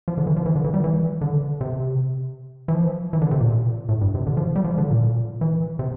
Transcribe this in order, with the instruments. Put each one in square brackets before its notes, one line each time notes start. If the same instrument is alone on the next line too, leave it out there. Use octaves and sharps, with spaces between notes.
[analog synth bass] F3
D3
E3
F3
E3
D3
E3
G3
E3
D3
C3
E3
F3
E3
D3
C3
A#2
A2
G2
C3
D3
F3
G3
F3
D3
A#2
E3
C3